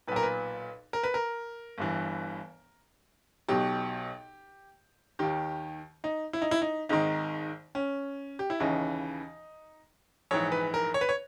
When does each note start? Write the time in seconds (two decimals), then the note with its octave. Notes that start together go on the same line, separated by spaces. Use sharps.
0.08 B1 B4
0.12 A#2 A#4
0.23 B4
0.93 A#4
1.04 B4
1.14 A#4
1.78 G1 G2 E3
3.48 B1 B2 G4
5.19 D#2 D#3 G4
6.04 D#4
6.33 E4
6.42 D#4
6.51 E4
6.62 D#4
6.89 G#1 G#2 D#3 D#4
7.75 C#4
8.39 G4
8.50 E4
8.60 D#2 C#3 E3 D#4
10.31 A#1 G#2 E3 C#5
10.52 B4
10.74 A#4
10.94 C#5
11.01 B4
11.09 C#5